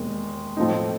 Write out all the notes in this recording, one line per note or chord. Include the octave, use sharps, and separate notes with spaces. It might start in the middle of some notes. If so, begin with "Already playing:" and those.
Already playing: E1 D#2 D#3 G#3
A2 F3 A3 C4 D#4